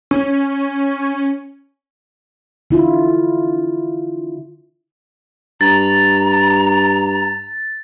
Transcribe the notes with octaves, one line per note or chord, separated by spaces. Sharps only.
C#4
D3 E4 F4
G2 A#5 A6